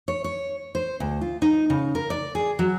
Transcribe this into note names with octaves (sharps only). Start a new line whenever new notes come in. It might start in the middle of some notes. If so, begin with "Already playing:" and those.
C#5
C#5
C5
D2
F4
D#4
C#3
A#4
D5
G#4
F#3